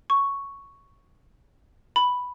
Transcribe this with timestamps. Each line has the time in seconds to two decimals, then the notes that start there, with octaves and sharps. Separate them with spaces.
0.10 C#6
1.96 B5